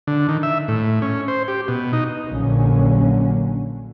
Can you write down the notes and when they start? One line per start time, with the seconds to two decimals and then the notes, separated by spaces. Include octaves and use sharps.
0.07 D3
0.29 D#3
0.43 E5
0.68 A2
1.02 C#4
1.28 C5
1.48 G4
1.68 B2
1.93 D#4
2.28 A#1 A#2 D3 F#3 A#3 C#4